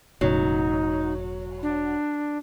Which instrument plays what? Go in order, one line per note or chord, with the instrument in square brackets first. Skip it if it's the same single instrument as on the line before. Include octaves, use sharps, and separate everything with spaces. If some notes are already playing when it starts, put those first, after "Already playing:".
[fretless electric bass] E1 A2 C#3 [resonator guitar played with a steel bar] F#3 [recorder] D#4
[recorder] D4